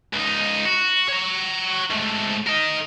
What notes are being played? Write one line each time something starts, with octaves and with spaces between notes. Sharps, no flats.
C#2 D#4
F#4
C#5 A#5
G#2 A3
A#4 D#5